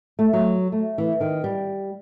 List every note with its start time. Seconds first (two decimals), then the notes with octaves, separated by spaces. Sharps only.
0.19 A3
0.33 F#3
0.72 A3
0.98 E3
1.21 D#3
1.44 G3